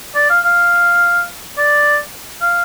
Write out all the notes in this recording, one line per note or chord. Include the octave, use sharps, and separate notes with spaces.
D5
F5
F5
D5
F5